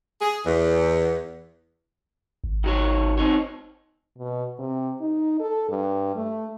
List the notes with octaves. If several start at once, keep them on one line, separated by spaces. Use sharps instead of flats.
G#4
E2
G#1
D#3 F#4 C#5
C4 D#4 C#5
B2
C3
D#4
A4
G2
A3